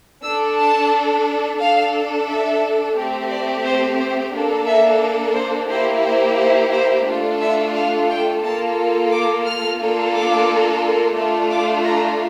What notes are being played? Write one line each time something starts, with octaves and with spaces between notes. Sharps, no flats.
D4 A4 E6
A5
D4 A4 F5
E5
A3 C4 G4
D5
C5
C5
A#3 D4 A4
E5
C5
A#3 E4 G4 C5
C5
C5
C5
A3 D4 F4 A4
E5
F5
G5
A#3 F4 A4 A5
D6
F6
A#3 D4 F4 A4
D6
A3 D4 F4 A4
D6
A#5